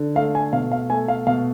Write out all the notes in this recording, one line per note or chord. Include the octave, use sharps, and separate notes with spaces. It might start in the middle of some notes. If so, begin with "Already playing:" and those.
Already playing: D3
A3 F5
G#5
B2 F5
F5
A3 G#5
F5
B2 F5